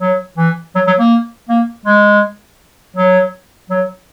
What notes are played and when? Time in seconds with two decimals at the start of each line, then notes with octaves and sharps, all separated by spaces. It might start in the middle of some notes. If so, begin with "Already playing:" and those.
0.01 F#3
0.38 E3
0.75 F#3
0.87 F#3
0.99 A#3
1.49 A#3
1.86 G#3
2.96 F#3
3.70 F#3